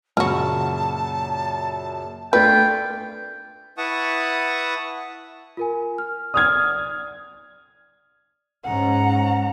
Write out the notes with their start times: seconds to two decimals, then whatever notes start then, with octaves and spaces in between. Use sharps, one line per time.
0.17 F#2 A#2 C#3 F4 F#4 A5
2.33 A3 D4 F4 B4 G5
3.77 E4 B4 F#5 A5 C#6 D#6
5.57 F4 A#4 G#5
5.98 F6
6.34 D5 D#6 F6 G#6
8.64 G#2 C#4 F#5 A#5